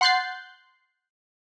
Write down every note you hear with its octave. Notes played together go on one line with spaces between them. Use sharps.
F#5 C6 F#6 G6 A6 C7